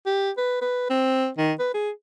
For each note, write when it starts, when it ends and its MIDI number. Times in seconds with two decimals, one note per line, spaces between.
0.06 0.31 67
0.37 0.59 71
0.61 0.89 71
0.90 1.28 60
1.38 1.53 51
1.60 1.69 71
1.74 1.90 68